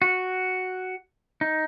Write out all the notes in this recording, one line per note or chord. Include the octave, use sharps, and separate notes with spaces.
F#4
D#4